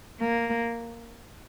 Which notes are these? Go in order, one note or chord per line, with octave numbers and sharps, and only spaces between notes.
A#3